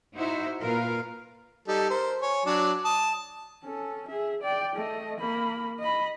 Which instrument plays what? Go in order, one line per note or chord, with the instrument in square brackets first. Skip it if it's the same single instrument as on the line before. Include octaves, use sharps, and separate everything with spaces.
[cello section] D#4 E4 F#4 C5 E5
A#2 F4 A#4 B4 F5
[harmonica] G3 D#4 A4
A#4 C5
C#5 G#5
F#3 D4 D5
A5 D#6
[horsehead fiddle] C#4 A4
G#4 E5
D5 G5
A3 D#5
A#3 B5
D#5 B5